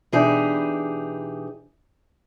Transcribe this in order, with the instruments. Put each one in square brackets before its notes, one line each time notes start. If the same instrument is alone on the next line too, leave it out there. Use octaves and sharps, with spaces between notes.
[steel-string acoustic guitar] B2 E3 D4 D#4 G4 G#4